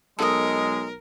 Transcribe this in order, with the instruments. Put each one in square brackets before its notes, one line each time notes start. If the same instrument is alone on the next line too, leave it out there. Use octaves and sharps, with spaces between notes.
[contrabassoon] B1 [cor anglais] G#3 [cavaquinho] A4 D#5 [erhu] A#4